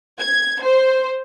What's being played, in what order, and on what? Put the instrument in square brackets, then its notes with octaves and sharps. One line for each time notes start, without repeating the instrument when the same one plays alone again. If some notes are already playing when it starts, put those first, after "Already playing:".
[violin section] G#6
C5